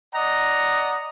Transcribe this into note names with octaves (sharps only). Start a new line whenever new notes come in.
D5 D#5 F#5 A#5